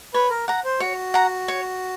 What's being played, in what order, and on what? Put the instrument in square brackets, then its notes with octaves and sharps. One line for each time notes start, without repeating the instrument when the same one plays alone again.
[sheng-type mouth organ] B4 [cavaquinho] C#5
[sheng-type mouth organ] A#4
[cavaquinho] F#5 A#5
[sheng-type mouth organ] C5
[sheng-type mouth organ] F#4 [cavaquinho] C#5
[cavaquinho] F#5 A#5
C#5